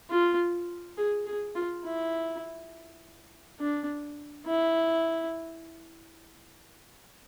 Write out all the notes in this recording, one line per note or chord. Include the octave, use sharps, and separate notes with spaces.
F4
G#4
G#4
F4
E4
D4
E4